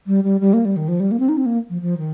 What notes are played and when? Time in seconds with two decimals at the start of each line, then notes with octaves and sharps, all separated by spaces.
0.07 G3
0.24 G3
0.41 G3
0.53 A#3
0.65 G3
0.76 D#3
0.88 F3
1.00 G3
1.11 A#3
1.20 C4
1.29 D#4
1.37 C4
1.46 A#3
1.70 F3
1.81 F3
1.98 D#3